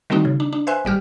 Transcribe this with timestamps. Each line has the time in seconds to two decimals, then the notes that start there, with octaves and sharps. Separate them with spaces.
0.10 D#3 G3 A3 C4 D#4 F#4
0.25 C#3
0.40 D4
0.53 D4
0.67 B4 C5 E5 G#5 C6 F#6
0.85 G#1 G3 G4 F6